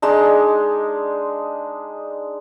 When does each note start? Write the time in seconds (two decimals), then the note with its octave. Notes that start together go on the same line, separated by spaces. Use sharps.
0.02 G#3 D4 D#4